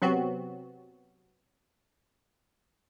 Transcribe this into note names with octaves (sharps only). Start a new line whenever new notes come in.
C3 F#3 B3 C4 F#4